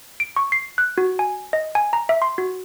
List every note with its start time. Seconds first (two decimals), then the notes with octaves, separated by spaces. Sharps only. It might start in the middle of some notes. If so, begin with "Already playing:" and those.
0.20 D7
0.37 C#6
0.52 C7
0.78 F#6
0.98 F#4
1.19 G#5
1.53 D#5
1.75 G#5
1.93 A#5
2.09 E5
2.22 C6
2.38 F#4